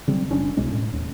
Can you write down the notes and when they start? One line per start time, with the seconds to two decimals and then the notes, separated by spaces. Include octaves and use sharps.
0.08 C#3 F#3 G3 C4
0.30 F#1 C#4 D4
0.57 C2 B2 G#3 C#4
0.71 A2
0.93 D#2